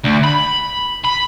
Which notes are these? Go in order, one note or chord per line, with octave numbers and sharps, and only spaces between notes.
D2
B5
B5